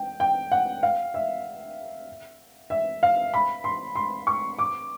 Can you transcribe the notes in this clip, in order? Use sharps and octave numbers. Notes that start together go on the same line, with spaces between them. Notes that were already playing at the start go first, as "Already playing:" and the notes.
Already playing: G5
G5
F#5
F5
E5
E5
F5
B5
C6
C6
C#6
D6